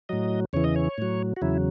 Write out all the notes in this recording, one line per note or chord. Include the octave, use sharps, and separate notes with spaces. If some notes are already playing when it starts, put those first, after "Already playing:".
A2 F#3 D#5
E2 C#3 E3 C#5
D#5
C#5
A2 F#3
F#4
E2 C#3 F#3 E4